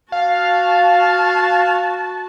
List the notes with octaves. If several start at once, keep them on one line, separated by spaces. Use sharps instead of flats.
F#4 F5 A5